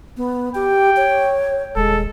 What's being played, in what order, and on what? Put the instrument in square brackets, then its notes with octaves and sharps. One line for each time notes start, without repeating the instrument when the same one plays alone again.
[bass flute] B3
[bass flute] G4 [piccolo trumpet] G5
[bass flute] C#5
[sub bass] D#1 [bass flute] G#3 [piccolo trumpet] A4